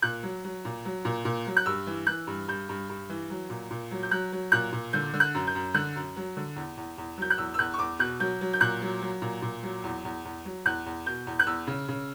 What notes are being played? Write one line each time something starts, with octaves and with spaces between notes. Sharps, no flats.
A#2 F#6
F#3
F#3
A#2
F#3
A#2
A#2
F#3
F#6
G2 E6
E3
E3 F#6
G2
G2 G6
G2
G2
E3
F#3
A#2
A#2
F#3
G6
F#3 F#6
F#3
A#2 F#6
A#2
D3 G6
D3
F#6
F#2
G6
F#2
D3 F#6
F#2
F#3
D3
E2
E2
E2
F#3 G6
F#6
E2 E6
E6
E2 F#6
C#6
E2 D6
B2 F#6
F#3 G6
F#3
G6
A#2 F#6
F#3
F#3
A#2
A#2
F#3
E2
E2
E2
F#3
E2 F#6
E2
B2 G6
E2
F#6
E2 E6
C#3
C#3